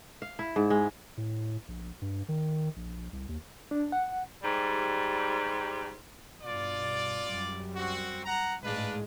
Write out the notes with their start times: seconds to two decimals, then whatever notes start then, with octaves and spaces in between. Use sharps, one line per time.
0.22 F5
0.39 E4
0.56 G#2
0.70 G#3
1.17 A2
1.68 A#1
2.02 G2
2.28 D#3
2.76 A#1
3.13 C2
3.29 D#2
3.71 D4
3.92 F#5
4.43 G#2 G3
6.42 G2 B2 F4 D5
7.28 F#2 G3
7.76 C4 F#4
8.25 F#5 A#5
8.63 A1 G#2 G#3 D4 F4 B4